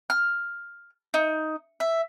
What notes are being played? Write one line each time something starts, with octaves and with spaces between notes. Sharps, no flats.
F6
D#4
E5